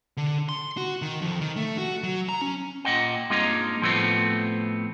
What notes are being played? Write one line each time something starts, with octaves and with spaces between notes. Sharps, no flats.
D3
C6
F#4
D#3
F2
D#3
A3
F#4
F#3
A#5
C#4
A#2 D#5 F#5 G5
G2 G#3 A#3 C4 D#4 F4
A2 F3 G3 A3 B3 C4